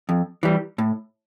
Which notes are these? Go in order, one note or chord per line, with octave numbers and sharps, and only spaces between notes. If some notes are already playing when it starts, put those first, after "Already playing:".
F2
E3 G3
A2